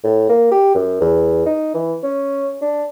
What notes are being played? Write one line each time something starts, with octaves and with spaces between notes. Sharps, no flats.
A2
A#3
G4
F#2
E2
D#4
E3
C#4
D4